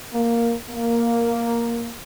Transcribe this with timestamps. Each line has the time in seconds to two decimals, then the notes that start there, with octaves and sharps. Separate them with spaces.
0.13 A#3
0.70 A#3